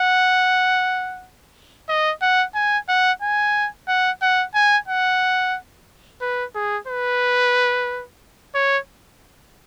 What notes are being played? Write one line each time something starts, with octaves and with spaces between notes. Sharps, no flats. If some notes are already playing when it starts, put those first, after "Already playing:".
Already playing: F#5
D#5
F#5
G#5
F#5
G#5
F#5
F#5
G#5
F#5
B4
G#4
B4
C#5